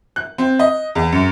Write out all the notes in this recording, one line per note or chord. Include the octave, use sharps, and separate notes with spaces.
F#6
C4
D#5
E2
F#2